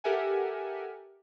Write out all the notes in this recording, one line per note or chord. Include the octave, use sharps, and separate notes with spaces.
G4 A4 A#4 E5 F#5 G#5